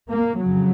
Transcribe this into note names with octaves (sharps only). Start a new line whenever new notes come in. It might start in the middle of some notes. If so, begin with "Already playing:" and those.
A#3
F2 C#3 F#3